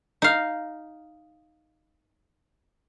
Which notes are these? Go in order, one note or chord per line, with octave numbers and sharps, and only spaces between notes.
D#4 F5